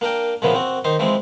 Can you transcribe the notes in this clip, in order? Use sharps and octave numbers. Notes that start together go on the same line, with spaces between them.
A#3 D4 A#4 G5
A#2 C#3 E3 F3 A#3 B3
C4 F#4
D#3 D#4 C5
E3 F3 G#3 C4